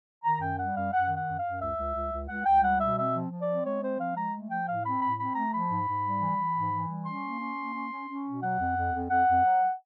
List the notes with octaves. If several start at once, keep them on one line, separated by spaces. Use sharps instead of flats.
D#3 A#5
F#2 G5
G3 F#5
F#2 F5
F#2 F#5
D#3
F#5
F#2
F5
F#2
C#2 E5
C#2
C#2
C#2
C#2 F#5
C#2 G5
G3 F#5
B2 E5
C4 E5
F3
F3
D5
C4
G#3 C#5
C4 C5
F3 F5
G#3 A#5
A3
F3 G5
A2 F5
C4 B5
A2 B5
C4 B5
A3 A#5
F3 B5
G#2
G#2
G3
E3
E3
G#2
E3
G3
C#4 C6
A#3
C#4
A#3
C#4
C#4
C#4
B2
F#3 F#5
F2
F2
F2
F2 F#5
F2
F#3